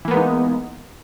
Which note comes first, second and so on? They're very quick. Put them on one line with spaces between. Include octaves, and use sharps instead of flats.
E3 A#3 B3 G#3 D#4